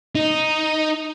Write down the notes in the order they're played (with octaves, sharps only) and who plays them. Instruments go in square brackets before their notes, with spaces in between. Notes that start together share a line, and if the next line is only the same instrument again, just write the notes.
[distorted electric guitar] D#4